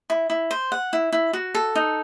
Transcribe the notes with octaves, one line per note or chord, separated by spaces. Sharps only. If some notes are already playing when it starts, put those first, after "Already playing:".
E4
E4
C5
F#5
E4
E4
F#4
A4
D#4